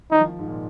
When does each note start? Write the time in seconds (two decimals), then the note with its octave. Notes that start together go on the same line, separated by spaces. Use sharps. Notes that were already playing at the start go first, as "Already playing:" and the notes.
0.11 D#3 D#4
0.20 F3
0.29 D#3
0.39 G#2
0.48 A#2